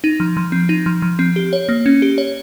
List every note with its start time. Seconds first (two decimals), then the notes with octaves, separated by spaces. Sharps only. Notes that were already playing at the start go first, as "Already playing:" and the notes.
0.04 D#4
0.20 F3
0.37 F3
0.52 C4
0.69 D#4
0.86 F3
1.02 F3
1.19 C4
1.36 G4
1.53 C#5
1.69 A#3
1.86 C#4
2.02 G4
2.18 C#5